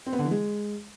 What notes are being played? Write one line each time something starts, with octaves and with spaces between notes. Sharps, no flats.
C4
B3
D3
E3
G#3